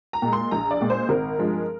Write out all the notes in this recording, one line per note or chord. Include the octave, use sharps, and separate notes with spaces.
A#5
A#2 G#3
C6
A#1 A#5
D5
A#2 G#3
C5
G#1 A#4
G2 F3 G#3